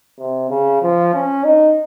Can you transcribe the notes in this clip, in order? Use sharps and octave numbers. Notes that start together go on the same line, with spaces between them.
C3
C#3
F3
C#4
D#4